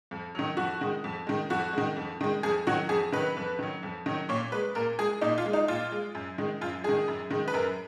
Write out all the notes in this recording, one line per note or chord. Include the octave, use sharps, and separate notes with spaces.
F2
D#3 F#3
F2 F#4
D#3 G#3
F2
D#3 G#3
F2 F#4
D#3 G#3
F2
D#3 G#3
F2 G#4
D#3 F#3 F#4
F2 G#4
D#3 F#3 B4
F2
D#3 F#3
F2
D#3 F#3
A#2 C#5
G#3 B4
A#2 A#4
G#3 G#4
A#2 D#4
F4
G#3
D#4
A#2 F4
G#3
F#2
D#3 G#3
F#2 F4
D#3 G#3 G#4
F#2
D#3 G#3
B4
F#2 A#4